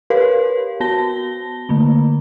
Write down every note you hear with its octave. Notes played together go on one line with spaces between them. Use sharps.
G4 A#4 B4 C#5 F5
B3 F#4 A5 A#6 G7
D3 A3 A#3